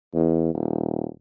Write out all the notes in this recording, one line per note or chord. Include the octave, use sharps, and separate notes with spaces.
E2
D#1